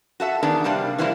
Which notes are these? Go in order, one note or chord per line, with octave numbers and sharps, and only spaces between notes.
F#4 A4 E5
E2 D#3 B3 D4 G#4
C3 G3 A#3 D4
E3 G3 A#3 C4 D4 E4